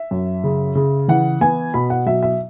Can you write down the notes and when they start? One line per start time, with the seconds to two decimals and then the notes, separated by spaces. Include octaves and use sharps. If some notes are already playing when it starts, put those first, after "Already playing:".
Already playing: E5
0.11 F#2
0.44 C#3
0.75 C#3
1.08 E3 F#5
1.41 B3 G#5
1.74 B2 B5
1.90 F#5
2.06 F#3 E5
2.23 E5